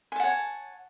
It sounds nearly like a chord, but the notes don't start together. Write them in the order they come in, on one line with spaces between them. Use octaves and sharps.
G#5 A5 F#5 C#5